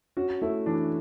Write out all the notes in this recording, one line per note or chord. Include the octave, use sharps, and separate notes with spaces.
C#4 F#4
A3 E4
E3 D4